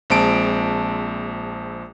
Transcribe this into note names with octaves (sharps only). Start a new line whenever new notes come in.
A#1 G#3 C4 A5 D7